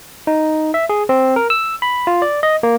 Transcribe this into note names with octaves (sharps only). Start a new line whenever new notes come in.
D#4
E5
G#4
C4
A#4
E6
B5
F4
D5
D#5
A#3